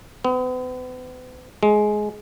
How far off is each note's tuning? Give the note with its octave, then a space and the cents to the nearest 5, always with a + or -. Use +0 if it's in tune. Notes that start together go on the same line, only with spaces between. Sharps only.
B3 +40
G#3 +15